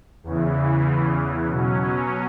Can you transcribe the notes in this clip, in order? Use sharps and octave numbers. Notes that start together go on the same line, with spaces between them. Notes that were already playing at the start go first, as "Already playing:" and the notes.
E2 C#3 E3
B2 F#3 C#4